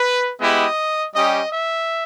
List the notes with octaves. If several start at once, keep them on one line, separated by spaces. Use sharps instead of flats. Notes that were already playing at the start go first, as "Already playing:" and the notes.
Already playing: B4
G#3 B3 E4 G4 D#5
G3 C#4 G4 D#5
E5